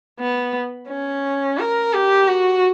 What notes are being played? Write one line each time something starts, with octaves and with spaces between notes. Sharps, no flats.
B3
C#4
A#4
G4
F#4